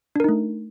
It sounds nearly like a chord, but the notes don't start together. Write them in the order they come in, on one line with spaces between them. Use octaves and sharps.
D4 A#4 D#4 A3